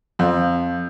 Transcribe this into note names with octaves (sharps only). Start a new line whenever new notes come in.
F2